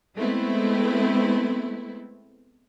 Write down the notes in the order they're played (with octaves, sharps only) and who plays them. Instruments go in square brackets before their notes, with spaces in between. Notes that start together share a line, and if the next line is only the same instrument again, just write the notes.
[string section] G#3 A3 B3 C4 E4